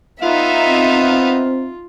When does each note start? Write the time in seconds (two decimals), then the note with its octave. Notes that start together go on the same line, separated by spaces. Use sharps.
0.22 B3 D#4 F4 E5 F5
0.69 C4